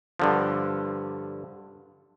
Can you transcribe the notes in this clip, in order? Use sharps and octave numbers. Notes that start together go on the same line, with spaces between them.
G2 D3 F3